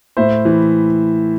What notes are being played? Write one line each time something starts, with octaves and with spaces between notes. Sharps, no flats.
A2 C5 E5
E3